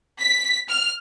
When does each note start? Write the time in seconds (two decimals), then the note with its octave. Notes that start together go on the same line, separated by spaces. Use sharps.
0.19 B6
0.69 F6